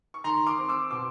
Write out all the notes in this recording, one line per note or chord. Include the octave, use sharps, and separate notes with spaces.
C#6
D#3 A#5 C6
C6 D6
C4
D6 E6
B2 C6 D6